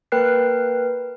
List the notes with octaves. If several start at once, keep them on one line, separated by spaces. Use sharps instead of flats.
A#3 A#4 B4 G5 F#6 C7